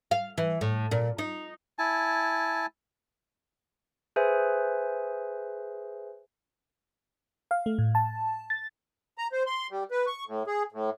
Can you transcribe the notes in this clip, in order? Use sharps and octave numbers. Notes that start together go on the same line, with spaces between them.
F5
E3
A2
A#2
D#4
E4 G#5 A5
G#4 B4 C5 E5 G#5
F5
A3
A2
A5
A6
A#5
C5
C6
G3
B4
C#6
A2
G#4
A2